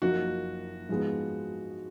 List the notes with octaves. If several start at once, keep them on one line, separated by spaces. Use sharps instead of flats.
F#1 F#2 F3 A#3 D#4 F#4
G#2 F3 G#3 B3